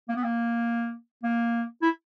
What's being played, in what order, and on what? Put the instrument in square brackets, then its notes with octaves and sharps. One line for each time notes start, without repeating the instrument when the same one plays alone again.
[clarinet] A#3
B3
A#3
A#3
E4